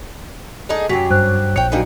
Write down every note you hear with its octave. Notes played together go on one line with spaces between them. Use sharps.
D4 D#4 G#4 A4
F#2 F#3 G4 B6
G2 C5 F#6
A#1 C#5 G5 C#7
F#3 G3 A#3 D4 D#4 G#4